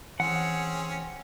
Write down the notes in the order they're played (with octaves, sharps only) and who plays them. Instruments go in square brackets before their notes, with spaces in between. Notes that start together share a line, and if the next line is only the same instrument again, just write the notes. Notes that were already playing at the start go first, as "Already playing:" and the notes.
[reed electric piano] E3 [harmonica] C4 C#4 G#4 [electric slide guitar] F#5